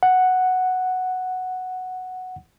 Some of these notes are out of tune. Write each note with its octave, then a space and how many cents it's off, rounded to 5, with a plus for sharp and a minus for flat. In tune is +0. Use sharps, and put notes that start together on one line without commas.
F#5 +0